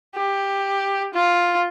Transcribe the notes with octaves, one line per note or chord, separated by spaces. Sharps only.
G4
F4